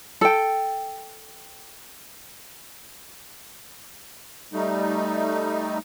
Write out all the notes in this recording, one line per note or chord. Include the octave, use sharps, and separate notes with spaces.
A4 G5
G3 A3 D#4